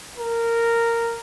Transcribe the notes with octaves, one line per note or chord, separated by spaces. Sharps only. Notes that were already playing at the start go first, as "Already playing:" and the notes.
A#4